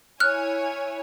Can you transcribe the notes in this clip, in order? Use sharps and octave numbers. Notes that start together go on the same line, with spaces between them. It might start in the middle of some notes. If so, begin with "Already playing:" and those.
E4 C#5 G#5 F6 F#6